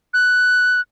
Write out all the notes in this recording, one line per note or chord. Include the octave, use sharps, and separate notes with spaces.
F#6